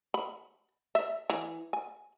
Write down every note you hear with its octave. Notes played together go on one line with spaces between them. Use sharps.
B5
E5
E3
G#5